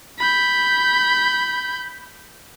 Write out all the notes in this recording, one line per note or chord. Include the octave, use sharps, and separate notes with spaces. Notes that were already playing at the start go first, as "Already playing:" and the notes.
B5 G6